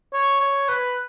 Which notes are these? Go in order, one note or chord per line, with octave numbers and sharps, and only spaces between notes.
C#5
C#5
B4